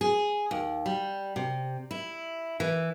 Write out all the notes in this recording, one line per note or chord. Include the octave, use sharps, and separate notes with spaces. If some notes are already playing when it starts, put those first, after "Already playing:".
G#4
D#2
G3
C3
E4
E3